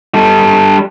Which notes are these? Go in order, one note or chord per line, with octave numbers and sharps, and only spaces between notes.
G3 A4